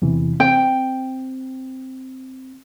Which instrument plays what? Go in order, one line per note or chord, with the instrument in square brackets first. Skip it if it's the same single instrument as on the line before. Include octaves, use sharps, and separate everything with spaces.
[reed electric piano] E2 C3 E3
[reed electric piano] C4 [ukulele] G5